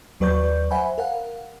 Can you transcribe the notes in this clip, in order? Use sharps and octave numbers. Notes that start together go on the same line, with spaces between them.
D#2 F#3 B4 D5 C#6 G6
C5 E5 F#5 G#5 B5
A#4 F5 F#5